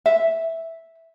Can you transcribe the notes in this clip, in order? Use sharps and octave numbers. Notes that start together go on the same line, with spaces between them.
E5